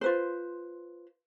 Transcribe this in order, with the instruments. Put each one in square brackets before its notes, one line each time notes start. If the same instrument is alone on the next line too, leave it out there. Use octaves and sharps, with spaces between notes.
[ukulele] F4 B4 C5